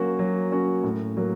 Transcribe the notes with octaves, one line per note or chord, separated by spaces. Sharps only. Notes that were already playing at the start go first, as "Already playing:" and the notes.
Already playing: F#3 A#3 C#4 F#4
F#3
A#3 C#4 F#4
A2
F#3 A#3